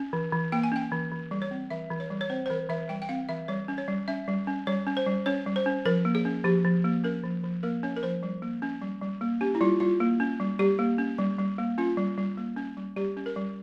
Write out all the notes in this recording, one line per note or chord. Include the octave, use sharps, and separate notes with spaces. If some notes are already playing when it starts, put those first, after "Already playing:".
Already playing: C#4
E3
E3
A#3 G5
G#5
C#4 G5
E3
E3
G3
C#5
C4
E3 E5
E3
C#5
G3
C#5
C4 C5
C5
E3 A#4
E3 E5
G3 G5
G5
C4 F5
E3 E5
G3 C#5
C#4
C#5
G3
C#4 E5
G3
C#4
G3 C#5
C#4
C5
G3
C#4 C#5
G3
C5
C#4
F3 A#4
A#3
G#4
C#4
F3 G4
F3
A#3
C#4 A#4
F3
F3
A#3 A#4
C#4 C#5
A#4
F3 C5
G3
A#3
C#4
G3
G3
A#3
C#4 G4
E4
G3 F4
G3 F4
A#3
C#4
G3
G3 G4
A#3
C#4
G3
G3
A#3
C#4 F4
G3
G3
A#3
C#4
G3
G3 G4
C#4
A#4
G3